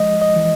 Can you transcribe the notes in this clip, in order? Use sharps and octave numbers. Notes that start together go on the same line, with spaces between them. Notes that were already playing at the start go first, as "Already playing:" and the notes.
Already playing: F3 G#3 D#5
D#5
E3